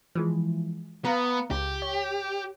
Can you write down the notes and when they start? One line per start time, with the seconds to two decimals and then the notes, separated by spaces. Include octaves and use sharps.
0.15 E3 F3 G#3
1.05 B3 F5 A#5
1.51 C#2 G4
1.82 C#5